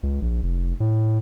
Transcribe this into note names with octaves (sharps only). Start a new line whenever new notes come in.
C#2
A#1
F1
A2